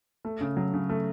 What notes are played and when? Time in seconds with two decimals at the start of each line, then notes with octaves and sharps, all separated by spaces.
0.25 A3
0.41 C#3
0.57 F#3
0.74 C#3
0.90 A3